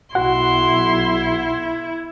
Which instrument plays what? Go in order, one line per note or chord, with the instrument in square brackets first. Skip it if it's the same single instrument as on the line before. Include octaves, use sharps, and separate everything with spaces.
[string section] B1 [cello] E4 [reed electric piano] F#4 F#5 [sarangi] C6